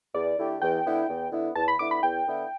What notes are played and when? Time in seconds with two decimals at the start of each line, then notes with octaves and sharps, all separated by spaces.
0.14 E2 D5
0.38 D3 A3 E4 G4
0.62 E2 G5
0.85 D3 B3 E4
1.09 E2
1.32 D3 B3 E4
1.55 E2 A5
1.68 B5
1.79 D3 B3 E4 D6
1.91 B5
2.03 E2 G5
2.26 D3 B3 E4